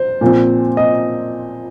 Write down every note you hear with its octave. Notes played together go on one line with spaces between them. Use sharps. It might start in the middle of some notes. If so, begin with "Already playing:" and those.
Already playing: C5
A#2 F3 C4
D#5